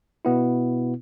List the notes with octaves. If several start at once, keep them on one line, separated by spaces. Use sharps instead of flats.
B2 B3 E4